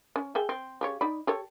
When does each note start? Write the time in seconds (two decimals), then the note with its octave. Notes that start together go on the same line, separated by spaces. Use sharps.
0.16 C#4
0.35 G#4 E5 G5
0.49 C4
0.81 C#3 G4 C#5
1.01 D#4 D5 B5
1.27 G4 A4 C#5